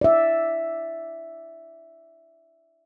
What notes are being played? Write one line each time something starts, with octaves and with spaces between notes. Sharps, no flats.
D5 E5